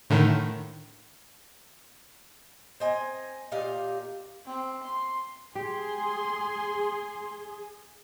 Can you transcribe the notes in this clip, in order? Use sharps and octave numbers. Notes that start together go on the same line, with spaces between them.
A2 D3 D#3
C4 D#5 G#5
A#2 D#4 G4 F5
C4
C6
G4 G#4 C6